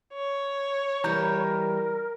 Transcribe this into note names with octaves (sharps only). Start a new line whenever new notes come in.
C#5
E3 G3 A#4 A#5 G6